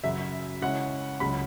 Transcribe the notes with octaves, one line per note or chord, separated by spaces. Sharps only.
F#2 C#3 F#3 E5
C#3 G#3 C#4 E4 F#5
C#2 C#3 F#3 B5